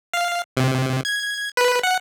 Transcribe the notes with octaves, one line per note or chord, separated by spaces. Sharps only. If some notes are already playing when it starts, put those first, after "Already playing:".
F5
C3
G#6
B4
F#5